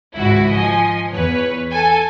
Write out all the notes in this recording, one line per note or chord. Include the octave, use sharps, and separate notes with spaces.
G#1 C#2 E4 F#4
F3 D#5 G#5
E2 B4 C#5
A4 G#5